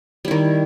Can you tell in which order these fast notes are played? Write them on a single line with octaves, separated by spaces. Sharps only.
G3 E4 D#3